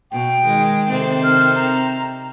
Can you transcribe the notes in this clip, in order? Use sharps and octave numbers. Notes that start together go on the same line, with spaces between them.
B2 G5
D#3 G#3
C3 C4 A4
F6
A#5